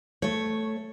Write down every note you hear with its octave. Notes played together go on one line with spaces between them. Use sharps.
A3 C#5